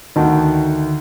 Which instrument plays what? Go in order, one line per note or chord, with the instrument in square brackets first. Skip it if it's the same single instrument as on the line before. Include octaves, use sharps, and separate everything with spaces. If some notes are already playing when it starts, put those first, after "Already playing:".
[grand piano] D2 D#3 F#4 A5